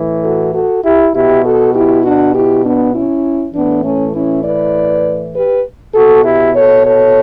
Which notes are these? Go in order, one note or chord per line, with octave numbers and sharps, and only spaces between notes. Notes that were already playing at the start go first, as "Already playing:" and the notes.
Already playing: A2 E3
F#4 A4
F#4 A4
E4 G4
B2 E4 G4
F#4 A4
E4 G4
D4 F#4
E4 G4
B3 D4
C#4 E4
A2 E3 B3 D4
A3 C#4
C#4 E4
B4 D5
G4 B4
B2 F#4 A4
E4 G4
A4 C#5
A4 C#5